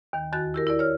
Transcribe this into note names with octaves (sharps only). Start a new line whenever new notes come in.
D#2 D#3
E2 D#3 F#4 F#6 A6
E4 G4 A#4
E4 A#4 D5
C#5 F6